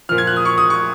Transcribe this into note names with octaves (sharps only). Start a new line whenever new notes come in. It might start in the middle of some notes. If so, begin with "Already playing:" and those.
A#2 F3 F6
G#6
F#6
D#6
C#6
D#6
C#6